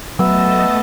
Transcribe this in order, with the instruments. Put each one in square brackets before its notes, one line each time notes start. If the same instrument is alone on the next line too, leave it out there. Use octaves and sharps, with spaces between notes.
[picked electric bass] F#3 [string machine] A3 D#5 A5 [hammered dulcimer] B3 [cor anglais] E5